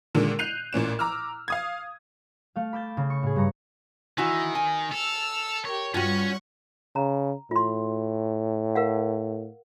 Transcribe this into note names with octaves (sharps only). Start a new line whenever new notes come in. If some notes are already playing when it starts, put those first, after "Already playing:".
A#2 D3 D#3 G#3
F#6 G6 C7 D#7 F7
A1 A#2 C#4 E7
A#5 D6 E6 F6
F5 D#6 G#6
A3 F5
B5 D6 E6 G6 A6
C#3
C#6
A2 G#4
G2 A#5 C#6
D#3 E3 E4 F#4
G#5
A4 E6 F6
G4 A#4 C#5
G2 C#4 F4 F#4 F#5 C#6
C#3 A#5
A2 F4 C6
A#4 F5 F#5